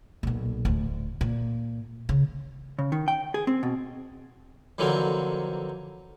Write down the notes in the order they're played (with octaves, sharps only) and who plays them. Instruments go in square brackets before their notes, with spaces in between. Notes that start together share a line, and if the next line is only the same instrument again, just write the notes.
[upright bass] B1 A#2
D1 D2
A#2
C#3
[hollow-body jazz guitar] C#3
D#3
G5
G#4
C4
B2
[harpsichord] F2 D3 E3 F#3 A#3 C4